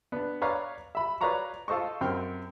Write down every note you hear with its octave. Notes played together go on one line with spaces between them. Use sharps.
B3 D4
B4 C#5 D5 F5 A#5
E5 B5
B4 C#5 D5 F5 A#5 C#6
F4 A4 C5 D#5 C#6
F#2 C4 G5 F6